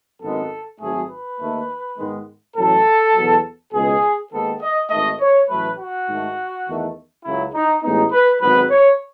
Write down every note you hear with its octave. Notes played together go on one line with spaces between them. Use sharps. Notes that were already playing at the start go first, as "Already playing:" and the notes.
G#1 F#2 D#3 G#3 B3 A4
G#1 G#2 F#3 A3 G#4
B4
D#2 D#3 A3
G#2 D#3 G#3 B3
A1 A2 F#3 A4
E2 B2 F#3
C#2 B2 G#3 G#4
D#2 D#3 G#3 B3 A4
D#5
G#1 G#2 D#3 A3 D#5
C#5
A1 A2 F#3 A3 B4
F#4
G#2 D#3 A3
E2 D#3 A3
C#2 C#3 F#3 E4
D#4
A1 A2 G#3 B3 D#4
B4
G#1 G#2 F#3 B3 B4
C#5